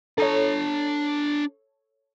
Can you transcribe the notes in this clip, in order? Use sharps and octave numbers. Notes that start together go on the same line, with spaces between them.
D4 A4 C#5 A#5